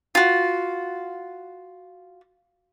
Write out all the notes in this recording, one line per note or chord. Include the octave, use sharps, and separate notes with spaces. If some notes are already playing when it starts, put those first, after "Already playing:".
F4 F#4